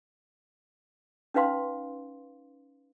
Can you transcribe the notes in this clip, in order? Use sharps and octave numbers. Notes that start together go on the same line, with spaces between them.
C#4 D#4 B4 F5 C6